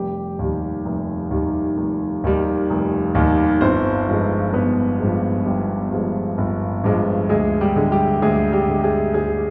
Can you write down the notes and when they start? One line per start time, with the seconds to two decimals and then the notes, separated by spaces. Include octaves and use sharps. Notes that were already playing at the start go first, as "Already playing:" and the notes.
Already playing: F1 G3 G4
0.39 D#2 D#3 G3
0.85 F1
1.31 D#2 D#3 G3
1.77 F1
2.24 D#2 D#3 G3
2.70 F1
3.15 D#2 D#3 G3
3.61 G1 C4 C5
4.08 G2 F3 G#3
4.53 G1 B3 B4
4.99 G2 F3 G#3
5.45 G1 G3 G4
5.92 G2 F3 G#3
6.38 G1
6.84 G2 F3 G#3
7.29 D2 G#3 G#4
7.61 G3 G4
7.76 D3 G#3
7.91 G3 G4
8.22 D2 G#3 G#4
8.52 G3 G4
8.68 D3 G#3
8.84 G#3 G#4
9.14 D2 G#3 G#4